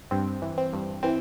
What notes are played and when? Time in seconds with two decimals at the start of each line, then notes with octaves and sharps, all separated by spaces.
0.11 G2 C4
0.42 E3
0.58 C4
0.73 G2
1.03 E3 C4